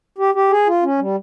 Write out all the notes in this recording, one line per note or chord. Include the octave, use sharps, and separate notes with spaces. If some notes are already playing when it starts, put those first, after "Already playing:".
G4
G4
G#4
F4
C#4
G3